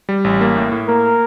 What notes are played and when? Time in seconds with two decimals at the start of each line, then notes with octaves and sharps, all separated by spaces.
0.09 G3
0.24 A1
0.41 A#3
0.56 A2
0.72 A2
0.88 A#3 A#4